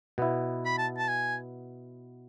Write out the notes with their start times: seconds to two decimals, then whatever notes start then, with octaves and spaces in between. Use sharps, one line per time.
0.18 B2 B3 E4
0.65 B5
0.78 A5
0.97 A5
1.08 G#5